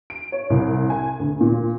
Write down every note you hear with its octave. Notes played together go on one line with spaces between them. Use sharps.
D7
C#5
C2
G#5
D2
A#2